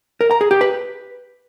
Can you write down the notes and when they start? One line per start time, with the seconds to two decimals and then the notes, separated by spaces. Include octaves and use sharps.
0.21 A#4
0.31 A#5
0.41 G#4
0.51 G4
0.61 B4